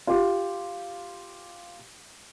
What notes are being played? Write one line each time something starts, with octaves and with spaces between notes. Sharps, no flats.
F4 G4